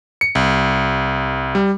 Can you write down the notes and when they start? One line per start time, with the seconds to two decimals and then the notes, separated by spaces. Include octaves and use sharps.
0.21 C#7
0.35 C2
1.55 G3